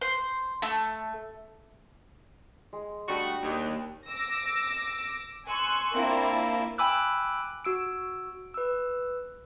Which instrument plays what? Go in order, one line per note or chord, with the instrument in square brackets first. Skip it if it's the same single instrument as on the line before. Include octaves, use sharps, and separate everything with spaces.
[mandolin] C5
A3
[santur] G#3
[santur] G3 D4 D#6 [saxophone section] A3 F#4
[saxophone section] D#2
[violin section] D6 E6 A#6
G#5 C6 C#6 E6 F#6
A#3 C4 D4 E4 F4 A5
[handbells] G5 G#5 B5 D6 E6 F#6
F#4 E6 D7
B4 E6